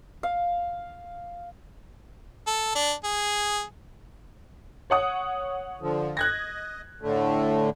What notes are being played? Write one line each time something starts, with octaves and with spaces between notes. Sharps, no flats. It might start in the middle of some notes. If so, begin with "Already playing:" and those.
F5
A4
D4
G#4
C#5 F#5 D#6
D3 F3
D#5 F#6 G#6 A#6
A2 D3 A3